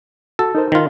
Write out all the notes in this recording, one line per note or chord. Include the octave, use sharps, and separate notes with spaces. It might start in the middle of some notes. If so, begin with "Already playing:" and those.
F#4 A4
D#4 A#4 C5
D#3 F4